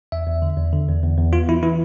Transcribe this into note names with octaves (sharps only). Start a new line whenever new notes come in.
E2 E5
E2
D3
E2
D3
E2
E2
E2
B3 F4
E3 E4
E3 E4